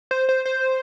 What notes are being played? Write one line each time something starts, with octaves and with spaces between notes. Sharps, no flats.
C5
C5
C5